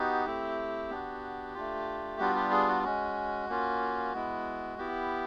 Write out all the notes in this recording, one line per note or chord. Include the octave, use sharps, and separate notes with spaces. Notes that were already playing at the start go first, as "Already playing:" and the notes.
Already playing: B3 D#4 F#4 G4
A3 C4 E4
B3 D4 F#4
A3 D4 F4
G3 B3 D4 F4 F#4
G4
G#4
F#4
G#3 C#4 F#4
A#3 C#4 F4
G#3 B3 E4
B3 E4 G4